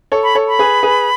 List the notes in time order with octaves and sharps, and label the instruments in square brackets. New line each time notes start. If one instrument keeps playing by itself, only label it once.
[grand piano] A4 C#5
[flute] B5
[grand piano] A4 C#5
[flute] B5
[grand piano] G#4 B4
G#4 B4